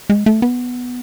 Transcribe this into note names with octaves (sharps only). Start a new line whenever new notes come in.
G#3
A3
B3